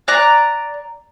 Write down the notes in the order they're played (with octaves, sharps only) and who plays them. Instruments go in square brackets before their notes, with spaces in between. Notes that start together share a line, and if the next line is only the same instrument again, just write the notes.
[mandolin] D5 A#5 F#6